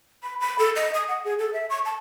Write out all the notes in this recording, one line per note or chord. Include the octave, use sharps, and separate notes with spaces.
B5
B5
A4
D#5
D#6
F#5
G#4
A4
E5
C#6
A5